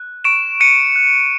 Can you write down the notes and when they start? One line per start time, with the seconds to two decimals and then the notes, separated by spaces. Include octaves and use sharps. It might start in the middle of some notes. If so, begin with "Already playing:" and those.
Already playing: F#6
0.24 C#6 D7 E7
0.60 F#6 C#7 D#7
0.96 F#6